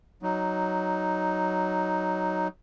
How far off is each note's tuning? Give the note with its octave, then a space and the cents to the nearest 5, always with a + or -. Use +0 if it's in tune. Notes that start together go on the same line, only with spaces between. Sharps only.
F#3 +5 D#4 +0